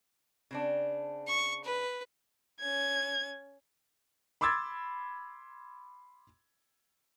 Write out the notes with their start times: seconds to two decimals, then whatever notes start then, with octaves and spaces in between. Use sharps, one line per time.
0.51 C#3 C4 D4
1.28 C#6
1.64 B4
2.61 C#4 G#6
4.41 B5 C6 D6 E6 G#6 A6